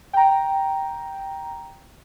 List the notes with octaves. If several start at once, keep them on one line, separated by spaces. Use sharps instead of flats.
G5 A#5